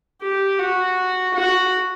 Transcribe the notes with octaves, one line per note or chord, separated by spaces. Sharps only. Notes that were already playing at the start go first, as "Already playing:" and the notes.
G4
F#4
F#4